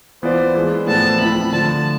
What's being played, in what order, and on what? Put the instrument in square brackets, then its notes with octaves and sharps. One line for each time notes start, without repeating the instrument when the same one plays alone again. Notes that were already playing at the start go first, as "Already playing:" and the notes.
[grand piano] E3 B3 F4 B4 D5 [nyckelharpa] C5
[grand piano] E3 G#3 B3 D4
[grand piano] A2 F3 B3 D4 A4 [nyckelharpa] A5
[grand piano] F3 A3 C4 E4 A4 [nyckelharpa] B5
[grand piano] D3 F3 A3 [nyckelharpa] A5